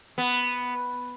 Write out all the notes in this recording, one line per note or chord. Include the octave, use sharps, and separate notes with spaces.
B3